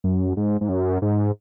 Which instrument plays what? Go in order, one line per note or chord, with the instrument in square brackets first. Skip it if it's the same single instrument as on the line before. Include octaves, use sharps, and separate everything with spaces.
[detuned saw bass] F#2
G#2
G#2
F#2
G#2